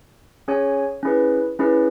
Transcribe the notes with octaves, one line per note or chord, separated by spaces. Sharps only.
C#4 G#4 C#5 G#5
C#4 E4 G#4 B4
C#4 E4 G#4 B4